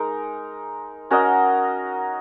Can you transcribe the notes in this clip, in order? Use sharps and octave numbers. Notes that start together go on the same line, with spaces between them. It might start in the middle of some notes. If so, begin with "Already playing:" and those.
Already playing: G#3 D#4 A#4
C#4 F#4 A#4 D#5